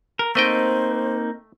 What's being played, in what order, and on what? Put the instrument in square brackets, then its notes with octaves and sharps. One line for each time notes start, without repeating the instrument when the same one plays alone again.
[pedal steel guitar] A#4
[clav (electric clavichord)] A3 D#5 G5 [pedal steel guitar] A#3 C4 D#4 [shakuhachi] C5